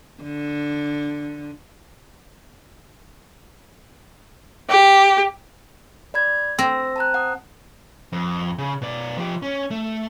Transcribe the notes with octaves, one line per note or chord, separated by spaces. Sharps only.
D3
G4
D5 B5 G#6
C4 E6 A#6
A5 A#5 F#6
F#5 D#6
F2
C#3
B2 D5
F3 G4
C#4
A3